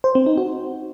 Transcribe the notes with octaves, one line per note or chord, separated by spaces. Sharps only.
C5
C4
D#4
F#4